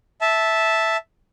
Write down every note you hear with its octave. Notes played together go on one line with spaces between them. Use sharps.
E5 A5